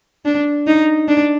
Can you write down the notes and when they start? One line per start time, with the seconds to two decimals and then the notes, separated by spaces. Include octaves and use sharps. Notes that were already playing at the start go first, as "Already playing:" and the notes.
0.25 D4
0.67 D#4
1.08 D4